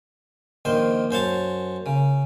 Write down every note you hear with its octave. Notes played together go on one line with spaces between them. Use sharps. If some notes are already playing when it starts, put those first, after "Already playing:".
A#1 D#3 C5
F#2 C5 C#5 A5
C#3